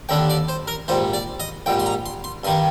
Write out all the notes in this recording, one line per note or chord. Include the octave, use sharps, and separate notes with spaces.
D#2 D3 G3 D4 G5
D5
C5
A#4
A#1 G#2 G3 C5
D5
D#5
A#1 G#2 G3 G5
C6
A#5
C6
C6
G2 D#3 G3 C6